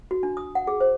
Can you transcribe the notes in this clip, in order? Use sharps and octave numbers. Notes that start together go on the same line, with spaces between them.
F#4
D4
D#6
F#5
G#4
C5